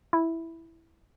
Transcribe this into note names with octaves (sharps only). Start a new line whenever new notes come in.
E4